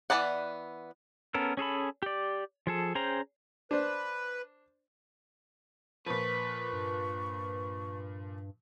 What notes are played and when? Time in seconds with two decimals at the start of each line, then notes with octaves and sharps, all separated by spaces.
0.10 E3 B3 D5 F#5
1.34 B3 C#4 A4 A#4
1.57 C#4 G#4 A4 B5
2.03 G4 D5
2.67 F3 G#4 A4
2.95 C#4 G#4 C5 G5 A#5
3.71 D4 B4 C5
6.06 A#2 F3 B4 C#6
6.73 G2